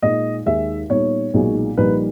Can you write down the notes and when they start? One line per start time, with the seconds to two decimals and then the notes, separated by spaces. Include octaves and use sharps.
0.02 A#2 G#3 D#4 D#5
0.46 D#2 D#3 G#3 E5
0.90 A#2 G3 B3 D#4 C#5
1.34 B1 A#2 G#3 D#4
1.77 A#1 A#2 G3 A#3 D#4 B4